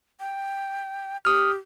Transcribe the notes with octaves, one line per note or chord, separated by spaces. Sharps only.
G5
G4 D#6 F6